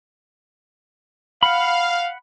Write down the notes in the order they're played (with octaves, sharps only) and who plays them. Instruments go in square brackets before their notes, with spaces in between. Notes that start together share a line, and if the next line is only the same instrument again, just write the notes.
[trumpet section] F5 [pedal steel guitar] F#5 B5